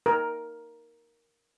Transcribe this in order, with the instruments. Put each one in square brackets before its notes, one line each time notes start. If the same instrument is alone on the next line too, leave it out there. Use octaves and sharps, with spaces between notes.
[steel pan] A#4